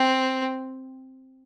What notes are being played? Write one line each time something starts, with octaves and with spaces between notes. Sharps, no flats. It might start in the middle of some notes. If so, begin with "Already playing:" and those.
Already playing: C4